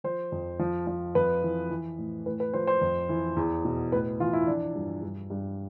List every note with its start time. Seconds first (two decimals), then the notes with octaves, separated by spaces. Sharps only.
0.04 F3 C5
0.32 F2
0.59 F3
0.87 F3
1.15 F2 B4
1.43 E3
1.70 E3
1.98 A2
2.26 A2 B4
2.40 B4
2.54 F3 C5
2.67 C5
2.81 F2
3.09 E3
3.36 E2
3.65 B2
3.92 A2 B4
4.20 E3 F4
4.33 E4
4.47 F3 D4
4.75 G2
5.02 G2
5.30 G2